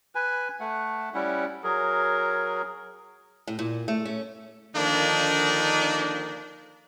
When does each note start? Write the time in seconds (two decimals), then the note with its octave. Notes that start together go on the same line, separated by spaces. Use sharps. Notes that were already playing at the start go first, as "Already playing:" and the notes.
0.15 B4 G#5
0.60 A3 F#5
1.14 G3 C#4 E4 F#5
1.64 F#3 G#4 A#4
3.48 A2
3.59 A#2
3.88 A3
4.05 C#4
4.75 D3 D#3 F3 A#3 D4 D#4